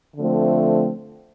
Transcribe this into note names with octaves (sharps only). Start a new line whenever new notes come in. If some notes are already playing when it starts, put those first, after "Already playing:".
D3 F3 A3 C4